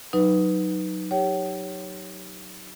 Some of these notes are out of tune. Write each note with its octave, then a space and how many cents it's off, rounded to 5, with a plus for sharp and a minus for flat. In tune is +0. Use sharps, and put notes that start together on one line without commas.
F#3 +0 D#4 +0 B4 +0
G4 +0 C#5 +0 G5 -45